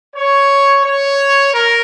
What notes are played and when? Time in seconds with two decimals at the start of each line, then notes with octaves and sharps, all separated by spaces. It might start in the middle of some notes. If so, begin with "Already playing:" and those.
0.15 C#5
0.84 C#5
1.53 A#4